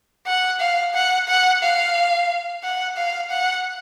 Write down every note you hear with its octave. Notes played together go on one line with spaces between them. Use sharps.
F#5
F5
F#5
F#5
F5
F#5
F5
F#5